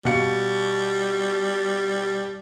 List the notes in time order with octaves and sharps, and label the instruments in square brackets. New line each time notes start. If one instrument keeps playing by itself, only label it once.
[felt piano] B2 F5 C#7 [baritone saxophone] G3